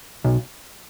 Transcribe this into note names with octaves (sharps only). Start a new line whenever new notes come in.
B1